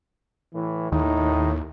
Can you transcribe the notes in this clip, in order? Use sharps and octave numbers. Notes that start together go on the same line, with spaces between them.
A2 E3
D#2 A2 D#4